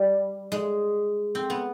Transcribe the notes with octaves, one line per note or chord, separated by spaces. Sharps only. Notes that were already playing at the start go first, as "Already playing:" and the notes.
Already playing: G3
G#3
C4
B3